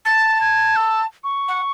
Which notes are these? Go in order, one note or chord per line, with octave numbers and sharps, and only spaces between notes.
A5 A6
G#6
E6
C#6
F#5